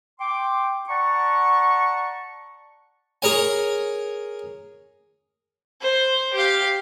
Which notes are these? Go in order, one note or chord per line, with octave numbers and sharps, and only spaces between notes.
G5 C6 D6
D5 F#5 A5 A#5 C#6
G#4 A#4 C#5 G#5
C5
G4 F5